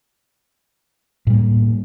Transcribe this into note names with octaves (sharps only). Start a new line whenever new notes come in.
A2 G3 A#3